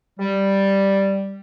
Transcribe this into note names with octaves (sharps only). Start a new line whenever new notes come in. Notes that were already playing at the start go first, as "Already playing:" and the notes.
G3